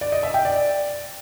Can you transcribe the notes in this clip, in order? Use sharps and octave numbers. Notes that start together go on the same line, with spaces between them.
D5
D#5
E5
G5
D5